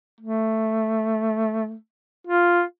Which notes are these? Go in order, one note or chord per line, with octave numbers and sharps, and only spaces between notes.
A3
F4